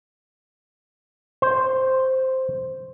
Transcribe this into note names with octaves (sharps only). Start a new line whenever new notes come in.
C5